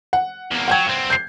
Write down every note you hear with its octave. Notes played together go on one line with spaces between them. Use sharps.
F#5
E2 A#3
F3 F#3 F#5 G5 G#6
G2 C4
G6 C7